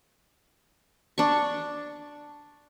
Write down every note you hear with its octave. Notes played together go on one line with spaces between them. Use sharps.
D4 C#6